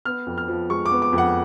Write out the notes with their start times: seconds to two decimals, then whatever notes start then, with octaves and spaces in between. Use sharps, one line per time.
0.05 B3 F6
0.26 F2
0.38 F6
0.48 F3
0.70 G#3 C#6
0.86 D6
0.91 B3
1.02 D6
1.13 F2
1.18 F#5